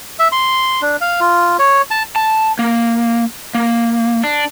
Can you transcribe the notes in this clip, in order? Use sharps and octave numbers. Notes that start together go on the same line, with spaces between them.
E5
C6
D4
F5
F4
C#5
A5
A5
A#3
A#3
D4